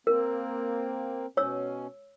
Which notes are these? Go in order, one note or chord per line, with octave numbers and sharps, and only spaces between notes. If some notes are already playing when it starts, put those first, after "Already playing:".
A#3 C4 A#4
B2 C#4 C#5 E6